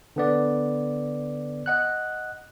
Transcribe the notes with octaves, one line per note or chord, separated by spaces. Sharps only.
D3 B3 D5
D#5 F#5 F#6